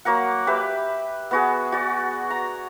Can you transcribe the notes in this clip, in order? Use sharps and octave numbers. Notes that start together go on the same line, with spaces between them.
F#3 A#3 A#4 F#5
G4 B4 E5
B3 F#4 G#4
F#4 D5
A#5